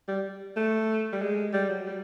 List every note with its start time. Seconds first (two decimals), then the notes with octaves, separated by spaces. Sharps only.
0.08 G3
0.56 A3
1.13 G3
1.22 G#3
1.53 G3
1.70 F#3
1.87 G3